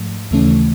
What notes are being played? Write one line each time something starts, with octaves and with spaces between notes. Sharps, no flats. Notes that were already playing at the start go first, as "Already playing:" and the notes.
Already playing: G#2 F3 A3
D#2 C#3 E3 A3 C#4